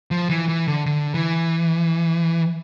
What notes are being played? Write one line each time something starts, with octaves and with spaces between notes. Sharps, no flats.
F3
E3
E3
D3
D3
E3